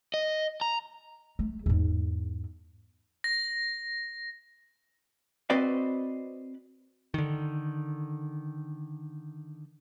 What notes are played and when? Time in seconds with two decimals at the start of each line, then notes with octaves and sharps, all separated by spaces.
0.14 D#5
0.61 A#5
1.39 A3
1.66 E2 G#2
3.24 A#6
5.50 C4 F#4 B4 C5 D5 D#5
7.14 D3 D#3